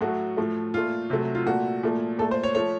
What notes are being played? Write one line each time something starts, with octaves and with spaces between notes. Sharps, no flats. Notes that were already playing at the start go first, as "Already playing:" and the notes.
A2 F#3 A3 F#4
A2 F3 A3
A#2 A3 F4
C3 F#3 A3
F4
A#2 A3 F#4
A#2 F3 A3
A#2 A3 A4
C5
C#5
F3 A3 C#5